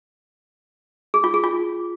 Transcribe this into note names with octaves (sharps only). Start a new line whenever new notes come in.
G#4
F4
G#4
F4